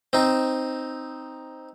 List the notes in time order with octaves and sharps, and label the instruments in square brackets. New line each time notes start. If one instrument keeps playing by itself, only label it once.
[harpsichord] C4 D#4